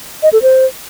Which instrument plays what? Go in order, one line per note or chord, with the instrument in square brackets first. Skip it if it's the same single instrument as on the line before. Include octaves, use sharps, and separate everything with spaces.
[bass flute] D#5
A4
C5